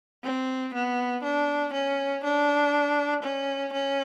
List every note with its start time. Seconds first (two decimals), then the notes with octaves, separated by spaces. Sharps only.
0.24 C4
0.74 B3
1.23 D4
1.73 C#4
2.24 D4
3.23 C#4
3.73 C#4